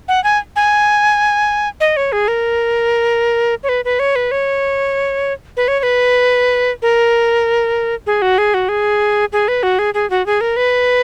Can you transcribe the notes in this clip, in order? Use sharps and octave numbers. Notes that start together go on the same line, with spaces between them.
F#5
G#5
G#5
D#5
C#5
G#4
A#4
C#5
B4
B4
C#5
B4
C#5
B4
C#5
C#5
B4
A#4
G#4
F#4
G#4
F#4
G#4
G#4
B4
F#4
G#4
G#4
F#4
G#4
A#4
B4